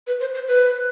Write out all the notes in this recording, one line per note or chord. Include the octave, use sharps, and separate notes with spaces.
B4
C5
C5
B4